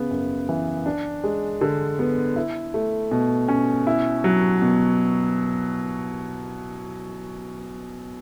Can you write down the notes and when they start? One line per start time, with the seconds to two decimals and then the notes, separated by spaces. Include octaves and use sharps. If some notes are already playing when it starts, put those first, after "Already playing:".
Already playing: C#3 B3
0.11 F#2
0.49 E3
0.86 D4
1.24 G#3
1.61 D3
1.99 B3
2.36 E4
2.74 A3
3.11 B2
3.48 C#4
3.87 E4
4.24 F#3
4.62 B2